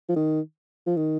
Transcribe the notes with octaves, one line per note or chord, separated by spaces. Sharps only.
F3
D#3
F3
D#3